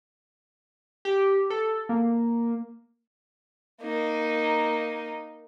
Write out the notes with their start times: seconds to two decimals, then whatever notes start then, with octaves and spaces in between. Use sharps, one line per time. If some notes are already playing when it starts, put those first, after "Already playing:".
1.05 G4
1.50 A4
1.89 A#3
3.82 A#3 D#4